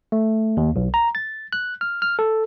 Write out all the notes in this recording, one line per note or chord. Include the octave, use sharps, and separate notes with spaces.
A3
D#2
B1
A#5
A6
F#6
F6
F6
A4